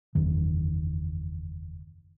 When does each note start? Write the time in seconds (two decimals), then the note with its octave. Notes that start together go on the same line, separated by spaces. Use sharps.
0.15 F#1 E2 D#3